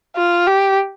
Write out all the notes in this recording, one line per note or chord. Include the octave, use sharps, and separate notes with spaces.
F4
G4